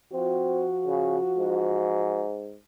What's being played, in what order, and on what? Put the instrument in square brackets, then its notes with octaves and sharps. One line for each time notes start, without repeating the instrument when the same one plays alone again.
[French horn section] F3 F4 F#4 [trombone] C4
[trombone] C#3
G#2